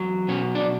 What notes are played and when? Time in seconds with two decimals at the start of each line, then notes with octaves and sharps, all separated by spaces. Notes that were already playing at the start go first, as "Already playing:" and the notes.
Already playing: E2 F#3
0.28 B2 C#4
0.55 D4